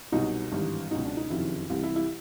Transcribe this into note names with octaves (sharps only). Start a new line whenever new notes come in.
C2 B2 F#3 D#4
G#1 G2 E3
C#2 B2 F#3 D#4
D4
D#4
F#1 F2 C3 D#3 F#3 E4
C2 C3 E3
E4
E4